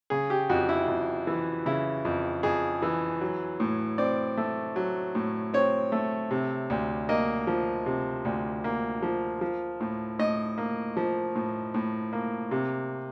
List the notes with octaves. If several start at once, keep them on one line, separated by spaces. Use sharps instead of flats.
C#3 G#4
G4
F2 F#4
E4
F2
E3
C#3 E4
F2
F2 G#4
E3
F#3
A2
C4 D5
A3
F#3
A2
C4 C#5
A3
C3
D2
A#3 D#5
F3
C3
D2
A#3
F3
F3
A2
A2 D#5
A#3
F3
A2
A2
A#3
C3